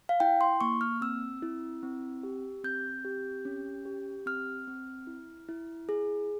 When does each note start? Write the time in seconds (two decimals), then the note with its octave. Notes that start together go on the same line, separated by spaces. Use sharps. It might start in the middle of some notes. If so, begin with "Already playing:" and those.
0.09 F5
0.20 E4 G5
0.41 C6
0.61 A#3 C#6
0.81 F6
1.01 C4 E6
1.42 E4
1.83 C4
2.23 G4
2.64 C4 G6
3.05 G4
3.45 C#4
3.85 G4
4.26 C4 F6
4.67 C4
5.07 E4
5.48 E4
5.89 G#4